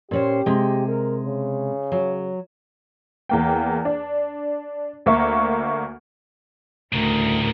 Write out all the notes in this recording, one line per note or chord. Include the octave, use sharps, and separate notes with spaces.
A#2 C#4 G4 C5
C3 G#3
A#4
C#3
F#3
E2 A#3 G5
D4
D2 A#3 E5 C#6
D2 A2 C#3 A#4